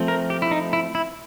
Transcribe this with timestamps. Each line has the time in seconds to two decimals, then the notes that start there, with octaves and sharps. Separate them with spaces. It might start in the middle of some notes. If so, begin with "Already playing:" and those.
Already playing: F3 A3 C4
0.08 A#4
0.30 G4
0.42 E4
0.51 D#4
0.73 E4
0.95 E4